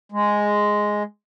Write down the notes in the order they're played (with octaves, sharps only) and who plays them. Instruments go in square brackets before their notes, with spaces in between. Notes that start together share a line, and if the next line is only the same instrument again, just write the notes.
[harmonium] G#3